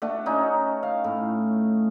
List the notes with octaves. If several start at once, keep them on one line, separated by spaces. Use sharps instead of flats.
A3 D4 F#4
C#4 D#4 F#4
F5
A2